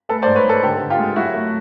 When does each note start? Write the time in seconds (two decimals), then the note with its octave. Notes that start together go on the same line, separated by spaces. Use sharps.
0.09 A3 A4 B4
0.22 C5 D5
0.26 G#2
0.36 B4 C#5
0.44 G#2
0.49 A4 B4
0.63 D3 G4 A4
0.81 D3
0.90 F4 G4
0.99 G#3
1.16 F#3 E4 F#4
1.34 A3